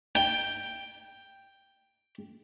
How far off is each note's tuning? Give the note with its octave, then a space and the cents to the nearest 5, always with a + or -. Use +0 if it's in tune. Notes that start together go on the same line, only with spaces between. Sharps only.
G5 +0